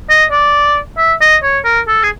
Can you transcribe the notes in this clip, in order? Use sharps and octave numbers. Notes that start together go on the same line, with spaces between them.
D#5
D5
E5
D#5
C#5
A#4
A4
G#4